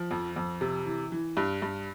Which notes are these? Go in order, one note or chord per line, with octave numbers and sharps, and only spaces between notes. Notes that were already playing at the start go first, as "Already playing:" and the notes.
Already playing: F3
F2
F2
C3
E3
E3
G2
G2